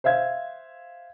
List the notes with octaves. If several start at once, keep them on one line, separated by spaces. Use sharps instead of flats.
C5 E5 F5 G#6